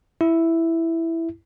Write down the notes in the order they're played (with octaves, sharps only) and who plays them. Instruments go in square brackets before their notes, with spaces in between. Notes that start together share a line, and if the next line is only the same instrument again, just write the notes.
[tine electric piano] E4